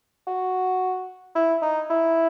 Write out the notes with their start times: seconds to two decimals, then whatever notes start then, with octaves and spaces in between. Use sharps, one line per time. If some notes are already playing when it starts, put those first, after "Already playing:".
0.27 F#4
1.35 E4
1.62 D#4
1.90 E4